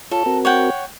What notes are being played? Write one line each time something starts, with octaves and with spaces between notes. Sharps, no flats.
F4 A4 C#5
C4 F#4 A#4
C#5 F#5 G5